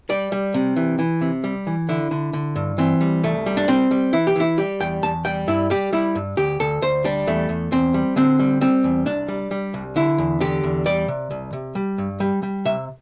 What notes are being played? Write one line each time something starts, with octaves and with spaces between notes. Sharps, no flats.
G3 D5
G3
C3
E3
E3
C3
G3
E3
D3 E4
D3
D3
G2
E3 C4
G3
C2 A3
G3
D4
G3 C4
G3
E3 E4
G4
E3 E4
G3 G4
E2 G5
E2 A5
G3 G5
G2 E4
G3 G4
G3 E4
G2
D2 G4
D2 A4
D2 C5
G3 D4
E2 A3
E2
E2 C4
G3
D3 C4
G3
G3 C4
E2
C2 D4
G3
G3
C2
D3 E4
E2
D3 G4
E2
G3 D5
C3
C2
C3
G3
G2
G3
G3
C3 E5